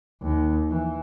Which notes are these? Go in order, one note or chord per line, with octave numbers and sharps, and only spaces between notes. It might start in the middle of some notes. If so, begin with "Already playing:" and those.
D#2
E3